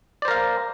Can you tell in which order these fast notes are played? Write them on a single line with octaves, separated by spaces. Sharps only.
D5 C5 A#4 F5